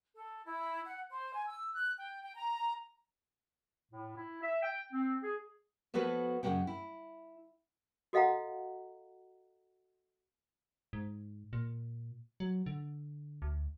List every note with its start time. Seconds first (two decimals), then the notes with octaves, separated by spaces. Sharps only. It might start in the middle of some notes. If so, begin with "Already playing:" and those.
0.16 A4
0.44 E4
0.85 F#5
1.10 C5
1.35 G#5
1.47 E6
1.75 F#6
1.99 G5
2.23 G5
2.35 A#5
3.92 A2
4.16 E4
4.42 E5
4.62 G5
4.93 C4
5.23 G#4
5.94 F3 B3 F#4 A4 B4 C#5
6.43 F#2 C#3 F#3 B3 F#5 G5
6.67 E4
8.13 F#4 A4 D#5 F5 F#5 A#5
10.93 G#2
11.53 A#2
12.40 F#3
12.66 D3
13.42 D2